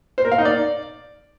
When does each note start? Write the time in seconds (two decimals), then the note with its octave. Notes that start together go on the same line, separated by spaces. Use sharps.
0.18 C5
0.25 A#4
0.32 F5
0.38 D#4
0.45 D5